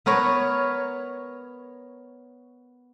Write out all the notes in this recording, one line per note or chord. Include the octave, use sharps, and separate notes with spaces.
B3 A#4 B4 C#5